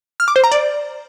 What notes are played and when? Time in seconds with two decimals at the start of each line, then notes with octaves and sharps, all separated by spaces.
0.20 F6
0.28 D6
0.36 C5
0.44 A#5
0.52 D5